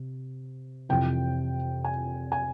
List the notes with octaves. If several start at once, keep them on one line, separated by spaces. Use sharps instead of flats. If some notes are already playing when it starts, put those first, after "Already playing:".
Already playing: C3
F2 C3 E3 G5
G#5
G#5